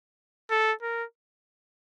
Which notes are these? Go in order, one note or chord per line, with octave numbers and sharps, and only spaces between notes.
A4
A#4